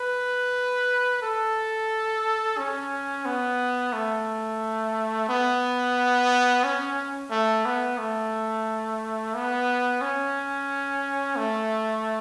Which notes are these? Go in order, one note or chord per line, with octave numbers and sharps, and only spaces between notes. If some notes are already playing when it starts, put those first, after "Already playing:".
Already playing: B4
A4
C#4
B3
A3
B3
C#4
A3
B3
A3
B3
C#4
A3